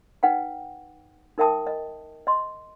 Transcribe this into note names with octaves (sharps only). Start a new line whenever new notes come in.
D#4 B4 F#5 G5
D#4 A#4 E5 G5 A5 D#6
D#5
D#5 C6